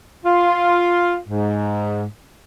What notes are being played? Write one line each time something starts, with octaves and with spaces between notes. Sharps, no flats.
F4
G#2